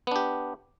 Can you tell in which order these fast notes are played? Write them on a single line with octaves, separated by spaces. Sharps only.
B3 D4 G4